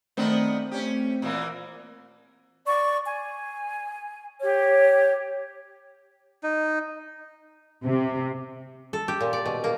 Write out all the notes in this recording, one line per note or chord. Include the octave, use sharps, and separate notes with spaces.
D#3 A3 B3 C4 D4 C5
C#4 G4
A#2 E3 A#3
D5 C#6
G#5
G4 C#5
D#4
C3
A4
G4
A#2
D5
B2
A#3